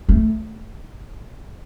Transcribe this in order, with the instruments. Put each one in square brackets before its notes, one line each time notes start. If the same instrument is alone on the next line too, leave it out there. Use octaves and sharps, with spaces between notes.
[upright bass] A3